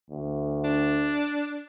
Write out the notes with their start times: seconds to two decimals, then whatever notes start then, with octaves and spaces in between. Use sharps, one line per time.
0.10 D2
0.64 D4